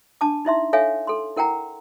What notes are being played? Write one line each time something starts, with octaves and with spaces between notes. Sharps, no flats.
D4 A5 D6
D#4 E4 E5 C6
A4 C#5 E5 F5 G#5
A4 C6
E4 A#4 F#5 G5 A#5